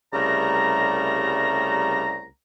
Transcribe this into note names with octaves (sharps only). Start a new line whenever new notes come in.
C2 C#3 G3 A3 A#4 A#5